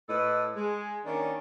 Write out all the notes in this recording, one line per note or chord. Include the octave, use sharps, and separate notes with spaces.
A2 A4 B4 D#5
G#3
D#3 A#3 C#4 D4